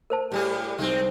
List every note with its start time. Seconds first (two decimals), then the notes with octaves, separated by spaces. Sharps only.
0.10 A#4 C5 A5
0.32 A2 G3 G4 G#4
0.79 C2 G#3 C4 D#4